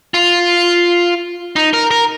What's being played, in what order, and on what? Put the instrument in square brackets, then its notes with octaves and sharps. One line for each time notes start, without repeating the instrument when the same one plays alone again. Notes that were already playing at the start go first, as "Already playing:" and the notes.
[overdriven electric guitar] F4
D#4
A#4
A#4